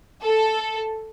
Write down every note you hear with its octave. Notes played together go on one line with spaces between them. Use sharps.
A4